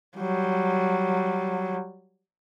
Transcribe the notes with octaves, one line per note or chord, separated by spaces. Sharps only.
F#3 G3